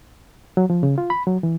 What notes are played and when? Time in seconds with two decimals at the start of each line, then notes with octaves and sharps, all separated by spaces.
0.57 F#3
0.70 F3
0.83 C#3
0.98 F4
1.10 B5
1.27 F#3
1.43 E3